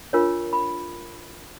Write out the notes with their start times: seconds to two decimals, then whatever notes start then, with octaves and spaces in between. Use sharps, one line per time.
0.13 D4 F4 A#4 C#5
0.53 B5